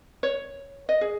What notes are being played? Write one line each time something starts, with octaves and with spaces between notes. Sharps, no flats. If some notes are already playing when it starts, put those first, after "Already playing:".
C#5
D#5
G#4